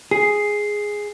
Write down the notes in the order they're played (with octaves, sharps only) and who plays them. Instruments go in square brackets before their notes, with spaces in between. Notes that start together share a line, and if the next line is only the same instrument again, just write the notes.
[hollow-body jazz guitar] G#4 [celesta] C7